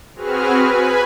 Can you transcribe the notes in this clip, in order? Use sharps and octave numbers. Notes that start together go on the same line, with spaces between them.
C4 F#4 G#4 B4 F6
B4 G#5 B5